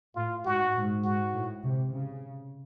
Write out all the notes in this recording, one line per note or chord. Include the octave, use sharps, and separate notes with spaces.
A2 F4
G#2 F#4
G#2
G#2 F#4
A2
C3
C#3